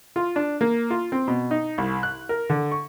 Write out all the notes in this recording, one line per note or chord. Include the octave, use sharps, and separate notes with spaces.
F4
D4
A#3
F4
C4
B2
D#4
C2
F#6
A#4
D3
C#6